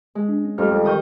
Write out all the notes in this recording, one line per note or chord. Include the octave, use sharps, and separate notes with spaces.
G#3
D4
C#4
F2 G3 A3 C#4 F6
F2
D#3 G5 C#6 D#6 G6